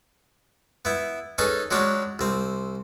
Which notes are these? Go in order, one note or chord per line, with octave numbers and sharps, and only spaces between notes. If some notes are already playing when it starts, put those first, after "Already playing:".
B3 E4
C#4 D#4 G#4 A4 B4
F#3 G#3 C#4 D4 G4 C#5
C2 C4